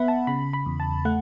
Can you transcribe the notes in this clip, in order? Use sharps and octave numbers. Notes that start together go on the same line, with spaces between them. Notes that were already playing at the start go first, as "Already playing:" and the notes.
Already playing: B3 E5 F#5 B5
A5
C#3 B5
B5
E2
A5
A3 F#5